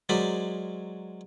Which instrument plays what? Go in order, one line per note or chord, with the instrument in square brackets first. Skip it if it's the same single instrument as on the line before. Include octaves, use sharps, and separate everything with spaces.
[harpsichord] F#3 G#3 A#4 C5 D5 B5